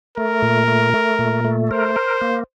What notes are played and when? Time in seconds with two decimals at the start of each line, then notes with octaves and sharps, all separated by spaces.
0.17 A3 A#4
0.42 A#2
0.68 A3
0.94 A3
1.19 A#2
1.45 A3
1.71 A#4 C5
1.96 A#4
2.21 A#3